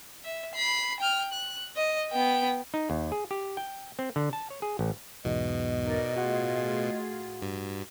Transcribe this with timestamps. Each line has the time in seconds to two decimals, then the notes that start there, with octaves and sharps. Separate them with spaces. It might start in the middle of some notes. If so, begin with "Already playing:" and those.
0.24 E5
0.55 B5 C7
1.00 G5 F6
1.32 F#6
1.77 D#5
2.11 B3 G5
2.74 D#4
2.90 D#2
3.12 G#4
3.31 G4
3.57 G5
3.99 C4
4.16 D3
4.33 A5
4.50 C#5
4.62 G#4
4.79 A1
5.25 B1 E2 G#2 B2 D#5
5.84 D#4 A#4 D5
6.16 A2 F4 F#4 G#4 F#5
7.42 G2